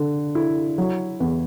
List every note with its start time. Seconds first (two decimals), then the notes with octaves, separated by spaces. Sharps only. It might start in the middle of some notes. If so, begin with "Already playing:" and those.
Already playing: D3
0.35 E4
0.78 F#3
1.20 E2